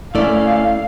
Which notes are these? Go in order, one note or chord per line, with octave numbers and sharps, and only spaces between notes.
A3 C#4 E4 A4 D5 F5